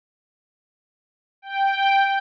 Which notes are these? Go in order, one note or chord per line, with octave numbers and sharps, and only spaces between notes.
G5